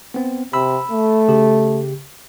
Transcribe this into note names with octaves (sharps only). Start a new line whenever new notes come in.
B3 C4
C3 B5 E6
A3
C#3 G4